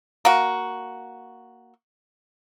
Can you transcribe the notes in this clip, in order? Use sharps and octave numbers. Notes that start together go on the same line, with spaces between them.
A#3 F#4